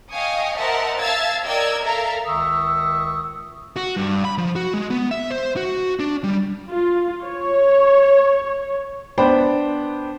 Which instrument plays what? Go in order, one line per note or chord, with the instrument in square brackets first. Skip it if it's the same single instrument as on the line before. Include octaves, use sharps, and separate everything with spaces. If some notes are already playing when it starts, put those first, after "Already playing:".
[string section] D#5 F5 G5 G#5 C#6 D#6
A#4 C5 D#5 E5 F#5 A5
E5 F5 A5 E6 G#6 A6
A#4 D5 D#5 G5 E6 G#6
A4 A#4 E5 F5 A#5
[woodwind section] C#2 D#3 E5 C#6 D#6 E6
[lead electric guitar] F#4
G2
B5
F3
F#4
G#3
B3
E5
C5
F#4
D4
G3
[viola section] F4
C#5
[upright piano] B3 D4 C5 G5 B5